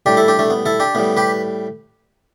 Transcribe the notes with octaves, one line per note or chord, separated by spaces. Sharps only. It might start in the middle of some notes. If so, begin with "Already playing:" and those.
A2 G3 D4 G4
E4 A4
D4 G4
A3 D4
B3
E4 A4
D4 G4
A2 G3 B3
G4 B4